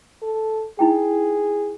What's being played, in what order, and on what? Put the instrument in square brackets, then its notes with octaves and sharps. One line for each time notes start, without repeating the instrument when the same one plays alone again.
[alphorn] A4
[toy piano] D#4 E4 G5 [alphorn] G#4